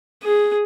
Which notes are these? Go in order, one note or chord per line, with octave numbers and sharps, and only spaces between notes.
G#4